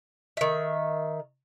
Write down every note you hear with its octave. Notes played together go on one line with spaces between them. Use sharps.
D#3 E5